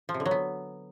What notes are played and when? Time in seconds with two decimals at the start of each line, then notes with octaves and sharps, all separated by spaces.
0.09 F3
0.14 C3
0.20 D3
0.26 F#3
0.31 B3